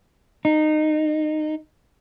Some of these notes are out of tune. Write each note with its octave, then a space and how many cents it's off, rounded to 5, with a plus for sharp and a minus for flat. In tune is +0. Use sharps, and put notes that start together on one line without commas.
D#4 -20